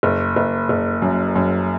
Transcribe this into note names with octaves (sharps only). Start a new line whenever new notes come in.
F#1
F#1
F#1
F#2
F#2